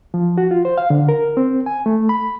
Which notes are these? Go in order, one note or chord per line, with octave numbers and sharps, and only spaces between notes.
F3
F#4
F4
C5
F5
D3
A#4
C4
G#5
A3
B5